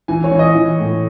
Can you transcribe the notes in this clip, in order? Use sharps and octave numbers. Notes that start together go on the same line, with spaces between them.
E3 G#5
C#5
E3
D#5
E3
A2